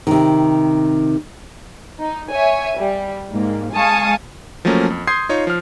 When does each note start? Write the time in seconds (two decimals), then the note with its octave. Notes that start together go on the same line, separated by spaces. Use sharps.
0.07 C3 D#3
2.00 D#4
2.32 C#5 E5 G#5
2.79 G3
3.31 G#2 A#3
3.74 G#3 F5 G#5 A5 C#6 D#6
4.65 F3 F#3 A3 A#3 C#4
4.90 F2
5.07 C6 D#6 G6 G#6 C7
5.29 D#4 F4 C#5
5.47 F3 F6